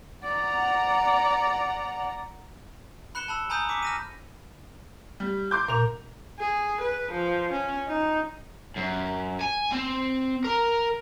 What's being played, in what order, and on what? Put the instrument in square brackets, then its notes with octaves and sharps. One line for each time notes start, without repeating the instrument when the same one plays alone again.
[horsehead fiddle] D5 [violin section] F#5 A#5
[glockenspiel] B5 F#6 C#7 E7 G7
A5 B5 E6
G#5 A#5 B5 D#6 G6
D6 B6 C#7
F6 A#6 D#7
[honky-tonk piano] G3
C6 D6 G6
[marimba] A#2 [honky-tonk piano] A#4 F7
[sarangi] G#4
B4
F3
C#4
D#4
[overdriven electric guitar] F#2
G#5
C4
A#4